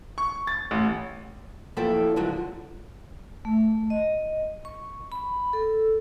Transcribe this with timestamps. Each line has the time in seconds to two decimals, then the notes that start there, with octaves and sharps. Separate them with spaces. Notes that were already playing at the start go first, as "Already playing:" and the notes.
0.18 C#6
0.47 A6
0.71 A1
1.76 F#2 F3 A#3 E4 A4 G5
2.16 D3 D#3 F3 F#3 G#3
3.45 A3
3.90 D#5
4.65 C#6
5.12 B5
5.53 A4